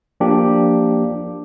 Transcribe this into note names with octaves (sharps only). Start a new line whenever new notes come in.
F3 A#3 D4 G4